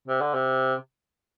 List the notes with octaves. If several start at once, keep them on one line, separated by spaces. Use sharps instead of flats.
C3
D3
C3